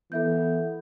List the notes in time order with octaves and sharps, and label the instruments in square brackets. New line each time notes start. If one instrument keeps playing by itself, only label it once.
[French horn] E3 [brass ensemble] B3 [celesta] A4 E5 G6